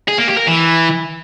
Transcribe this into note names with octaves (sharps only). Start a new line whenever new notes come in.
G#4
A#3
G4
A#4
E3